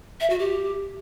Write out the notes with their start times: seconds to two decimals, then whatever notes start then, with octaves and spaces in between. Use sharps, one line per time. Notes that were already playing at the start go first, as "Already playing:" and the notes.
0.21 E5
0.30 F#4
0.39 G4